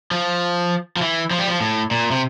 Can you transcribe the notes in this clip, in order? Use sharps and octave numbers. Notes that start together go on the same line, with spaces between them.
F3
F3
E3
F3
G3
F3
A2
A#2
C3